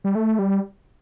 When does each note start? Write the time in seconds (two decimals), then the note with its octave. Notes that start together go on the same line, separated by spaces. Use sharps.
0.04 G3
0.15 A3
0.39 G3